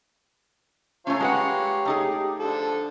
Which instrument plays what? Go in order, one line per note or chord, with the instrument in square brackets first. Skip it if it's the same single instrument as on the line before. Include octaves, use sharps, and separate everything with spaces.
[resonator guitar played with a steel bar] A3 C#4 [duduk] F4 [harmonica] C#5 F5 A#5
[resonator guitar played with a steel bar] G#3 B4 F#5 [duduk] G4
[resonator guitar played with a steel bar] A3 D#4 G#4
[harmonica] D3 F3 A4